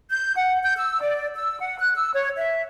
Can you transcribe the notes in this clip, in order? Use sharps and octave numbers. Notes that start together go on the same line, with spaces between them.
G6
F#5
G6
E6
D5
E6
F#5
F#6
E6
C#5
E5